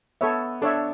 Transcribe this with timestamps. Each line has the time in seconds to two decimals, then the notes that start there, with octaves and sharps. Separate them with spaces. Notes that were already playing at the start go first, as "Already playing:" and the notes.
0.21 B3 A4 C#5 E5
0.62 D4 A4 C#5 E5